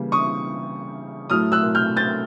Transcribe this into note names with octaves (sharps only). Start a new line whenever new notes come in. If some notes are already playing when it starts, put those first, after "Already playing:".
Already playing: C#3 E3 G3 A#3
C#6 D#6
A2 F#3 A3 D#6 F6
E6 F#6
F6 G6
G6 A6